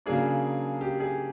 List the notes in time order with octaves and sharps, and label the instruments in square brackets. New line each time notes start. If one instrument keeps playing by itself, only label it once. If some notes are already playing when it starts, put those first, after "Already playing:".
[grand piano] C#3 F#3 A#3 D4 G#4
G4
G#4